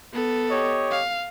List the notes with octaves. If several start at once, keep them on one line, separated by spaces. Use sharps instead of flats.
B3 A4
G4 C#5 D#5
F5